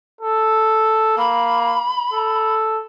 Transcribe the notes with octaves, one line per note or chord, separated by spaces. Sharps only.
A4
A#3 B5
A4